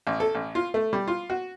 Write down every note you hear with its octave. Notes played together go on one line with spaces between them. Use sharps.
A1
A4
A1
F4
A3
G3
F4
F#4